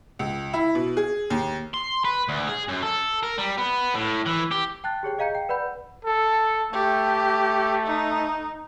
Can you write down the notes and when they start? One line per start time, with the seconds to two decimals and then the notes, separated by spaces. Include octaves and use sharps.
0.19 C#2
0.53 E4
0.75 B2
0.97 G#4
1.30 D#2
1.74 C6
2.05 B4
2.29 D2
2.48 G#4
2.68 F#2
2.83 A4
3.23 A#4
3.38 G3
3.58 B3
3.95 A2
4.26 E3
4.51 G4
4.84 G5 A5 F#6 A6
5.03 G4 G#4 C#5 G5
5.18 G#4 D#5 F5 A#5 G6 C#7
5.35 G5
5.49 B4 D5 F#5 B5 G6
6.05 A4
6.73 A3 G4
7.86 D#4